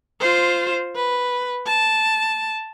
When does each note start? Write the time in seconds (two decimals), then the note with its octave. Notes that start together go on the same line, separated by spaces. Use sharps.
0.20 F4 C5
0.95 B4
1.66 A5